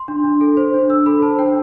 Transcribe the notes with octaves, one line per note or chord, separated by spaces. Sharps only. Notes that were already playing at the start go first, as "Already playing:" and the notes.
Already playing: C6
D4
D4
A4
C5
D4
D4 E6
A4 B5
C5 A5
D4 G5